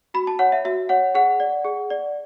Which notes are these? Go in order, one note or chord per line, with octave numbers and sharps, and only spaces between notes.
F#4 B5
A5
C#5 F#5
E5
F#4 E5
C#5 F#5
G#4 F#5
D5
G#4
D5